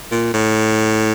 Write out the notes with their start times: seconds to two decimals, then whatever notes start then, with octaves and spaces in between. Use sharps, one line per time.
0.12 A#2
0.34 A2